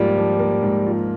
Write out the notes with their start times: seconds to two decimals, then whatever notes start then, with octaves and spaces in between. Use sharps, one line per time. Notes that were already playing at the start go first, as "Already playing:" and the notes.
Already playing: G#2 F3 G3 A#3 F4
0.16 F3
0.39 A#3
0.63 G#2
0.86 F4